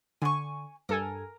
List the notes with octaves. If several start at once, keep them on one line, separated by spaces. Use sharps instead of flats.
D3 G#5 C#6
G2 A4 A#4 G#5